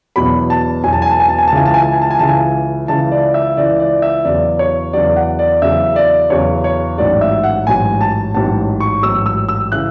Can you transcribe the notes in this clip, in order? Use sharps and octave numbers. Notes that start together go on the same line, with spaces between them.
E1 E2 B2 F#3 B5
A5
E1 E2 B2 F#3 G#5
A5
G#5
A5
G#5
A5
G#5
A5
C#2 C#3 E3 G#5
A5
G#5
A5
G#5
A5
G#5
C#2 C#3 E3 A5
G#5
C#2 C#3 E3 A5
D5
E5
C#2 C#3 E3 D5
D5
E5
E2 C#3 F#3 D5
C#5
E2 C#3 F#3 D5
F#5
D5
E2 C#3 F#3 E5
D5
E2 C#3 F#3 C#5
C#5
A1 G#2 F#3 D5
E5
F#5
A1 G#2 F#3 G#5
A5
A1 G#2 F#3 A5
C#6
A1 G#2 F#3 E6
E6
E6
C#3 E3 F#6